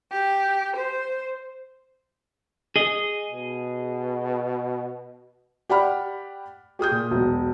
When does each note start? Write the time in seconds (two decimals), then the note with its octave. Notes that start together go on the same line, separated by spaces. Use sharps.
0.11 G4
0.75 C5
2.76 G#4 D#5
3.32 B2
5.69 G4 D5 F#5 B5 F6
6.79 G4 G#4 D#6 G6
6.91 A#2
7.10 E1 B1